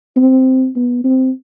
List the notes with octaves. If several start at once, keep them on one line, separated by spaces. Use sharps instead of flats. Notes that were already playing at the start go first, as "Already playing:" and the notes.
C4
B3
C4